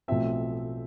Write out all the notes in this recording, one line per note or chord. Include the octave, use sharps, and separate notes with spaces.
B1 A2 F3 C4 E5